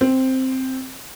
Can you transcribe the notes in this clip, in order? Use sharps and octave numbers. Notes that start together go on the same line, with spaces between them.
C4